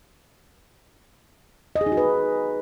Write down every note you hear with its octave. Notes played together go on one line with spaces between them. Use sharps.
D#5
G#4
D#4
F#4
B4